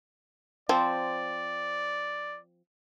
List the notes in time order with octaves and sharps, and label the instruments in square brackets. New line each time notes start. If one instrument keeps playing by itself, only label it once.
[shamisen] F3 C4 [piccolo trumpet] D5